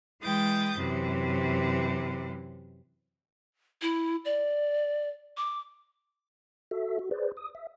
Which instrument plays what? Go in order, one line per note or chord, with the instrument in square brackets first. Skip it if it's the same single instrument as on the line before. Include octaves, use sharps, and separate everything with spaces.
[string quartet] E3 G#3 G5 D#6 G6 A6
F#2 C3 E3
[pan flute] E4
D5
D6
[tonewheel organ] F#4 A4 E5
F#4
G#4 B4 C5 D5
D#6
E5